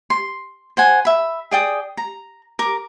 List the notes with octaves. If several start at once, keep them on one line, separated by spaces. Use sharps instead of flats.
C6
C5 F#5 G#5
E5 B5
G#4 D5 G5 D#6
A#5
A#4 D6